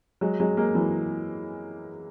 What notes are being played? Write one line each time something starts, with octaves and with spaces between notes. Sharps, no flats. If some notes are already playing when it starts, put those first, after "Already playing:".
F#3 G#3
F#3 G#3
G#3 A#3
E3 F#3